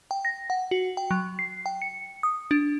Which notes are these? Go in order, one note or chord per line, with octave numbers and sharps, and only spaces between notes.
G5
A#6
F#5
F#4
G5
F#3
C7
G5
C#7
D#6
D4